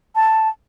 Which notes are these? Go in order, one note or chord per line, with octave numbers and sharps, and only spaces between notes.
A5